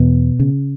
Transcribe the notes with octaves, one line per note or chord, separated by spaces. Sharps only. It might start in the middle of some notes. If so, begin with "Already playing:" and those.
Already playing: E2 B2 B3
C#3